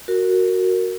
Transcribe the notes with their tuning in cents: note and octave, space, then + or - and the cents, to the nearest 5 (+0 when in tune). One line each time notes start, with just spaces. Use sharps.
F#4 +0 A#4 -15